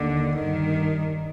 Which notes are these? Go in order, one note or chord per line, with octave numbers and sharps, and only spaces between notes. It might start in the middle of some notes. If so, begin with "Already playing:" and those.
Already playing: D#2 D3
G2 D#3